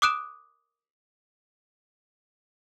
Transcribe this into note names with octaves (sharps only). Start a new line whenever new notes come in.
D6 D#6 F#6 D7 E7